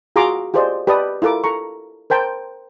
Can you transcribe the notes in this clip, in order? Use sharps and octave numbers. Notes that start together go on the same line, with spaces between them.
F4 F#4 G#4 A#5 C6 D6
F4 G4 G#4 C5 D5 D#5
G4 B4 D5 D#5 A5 D#6
E4 F4 A4 A#4 D6
A4 A#5 C#6
A#4 C5 G5 A5